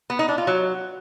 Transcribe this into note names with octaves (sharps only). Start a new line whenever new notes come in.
B3
D#4
D4
F4
F#3